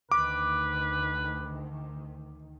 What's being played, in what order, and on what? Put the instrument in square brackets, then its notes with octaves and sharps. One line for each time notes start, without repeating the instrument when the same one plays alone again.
[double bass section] D2 D#3 [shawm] B4 [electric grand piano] D6